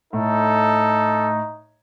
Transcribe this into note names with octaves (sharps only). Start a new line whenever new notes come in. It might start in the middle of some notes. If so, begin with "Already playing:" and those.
A2 D#4 A4